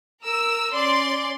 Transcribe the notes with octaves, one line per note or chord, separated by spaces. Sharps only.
A#4 E6
C#4 D5 C6